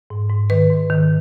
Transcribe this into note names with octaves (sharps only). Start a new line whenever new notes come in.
G#2
G#2
D#3 B4
G#2
D#3